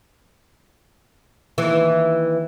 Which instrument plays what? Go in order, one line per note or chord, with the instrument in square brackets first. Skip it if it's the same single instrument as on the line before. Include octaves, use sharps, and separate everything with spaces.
[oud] D#2 E3